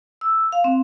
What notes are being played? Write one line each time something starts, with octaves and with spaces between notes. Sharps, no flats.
E6
F5
C4